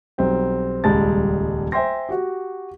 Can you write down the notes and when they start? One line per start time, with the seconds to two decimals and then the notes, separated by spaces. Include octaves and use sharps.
0.18 B1 G3 C4 G5
0.84 D#1 C#2 G3 G#3 A5 A6
1.72 C5 E5 G5 G#5 C6 A#6
2.09 F#4 G4